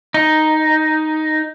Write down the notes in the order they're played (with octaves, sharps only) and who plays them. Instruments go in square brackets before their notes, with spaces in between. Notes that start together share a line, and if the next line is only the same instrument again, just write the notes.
[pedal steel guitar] D#4